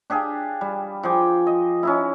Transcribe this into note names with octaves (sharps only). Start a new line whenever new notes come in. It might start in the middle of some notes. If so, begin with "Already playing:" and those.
D4 G4 G#4 F5
G3
F3 G#4 G5 D6
D#5
C#4 D#4 E4